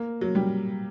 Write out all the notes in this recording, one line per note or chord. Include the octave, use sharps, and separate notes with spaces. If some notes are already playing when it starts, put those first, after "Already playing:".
Already playing: A#3
F#3
G3